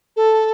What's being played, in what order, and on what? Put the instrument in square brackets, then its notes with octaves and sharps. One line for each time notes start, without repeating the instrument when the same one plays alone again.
[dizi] A4